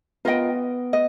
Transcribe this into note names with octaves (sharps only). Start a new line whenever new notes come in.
B3 F4 A#4 D#5 G5
D#5